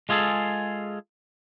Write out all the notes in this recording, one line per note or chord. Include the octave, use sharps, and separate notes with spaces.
G#3 F4 G#4 A4